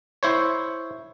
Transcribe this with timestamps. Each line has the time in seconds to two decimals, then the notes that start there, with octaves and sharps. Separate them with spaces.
0.23 E4 C5 C#5